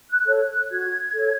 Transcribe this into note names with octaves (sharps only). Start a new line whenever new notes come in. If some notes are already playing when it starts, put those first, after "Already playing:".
F#6
A4 C#5
F#6
F#4 G#6
A4 C#5